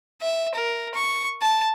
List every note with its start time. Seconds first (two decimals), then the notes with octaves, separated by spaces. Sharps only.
0.21 E5
0.55 A#4
0.94 C#6
1.41 A5